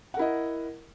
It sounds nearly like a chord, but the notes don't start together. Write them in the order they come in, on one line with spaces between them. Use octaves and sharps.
F#5 A#4 E4 D#5